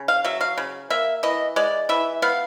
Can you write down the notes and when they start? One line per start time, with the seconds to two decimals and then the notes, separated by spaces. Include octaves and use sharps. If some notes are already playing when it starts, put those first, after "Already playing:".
Already playing: C#3
0.08 F5
0.24 F#3 E5
0.41 F5
0.57 C#3
0.90 A#3 E5
1.23 E3 D#5
1.56 G#3 D5
1.89 E3 E5
2.22 B3 F5